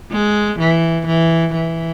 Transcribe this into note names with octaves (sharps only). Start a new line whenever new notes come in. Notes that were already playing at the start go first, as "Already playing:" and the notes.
G#3
E3
E3
E3